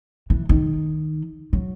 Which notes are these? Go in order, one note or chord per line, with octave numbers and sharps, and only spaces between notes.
E3
D#3
F#3